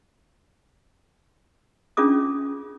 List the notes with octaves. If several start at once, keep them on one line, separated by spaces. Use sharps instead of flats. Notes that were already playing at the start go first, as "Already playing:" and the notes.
C#4 D4 F4 G#4 D6 D#6